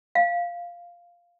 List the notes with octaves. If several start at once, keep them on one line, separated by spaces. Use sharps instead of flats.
F5